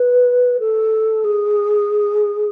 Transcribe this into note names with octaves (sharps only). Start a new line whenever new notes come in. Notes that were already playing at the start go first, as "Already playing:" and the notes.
Already playing: B4
A4
G#4